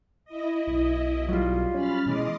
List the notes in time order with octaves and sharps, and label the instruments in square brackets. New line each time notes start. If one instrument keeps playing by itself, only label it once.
[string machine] E4 D#5
[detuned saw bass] B1
[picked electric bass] F#3 G3 [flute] F4
[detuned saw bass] C#4 [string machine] B5 F6 A6
[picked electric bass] B2 E3 G#3 [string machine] D#5 C6 D6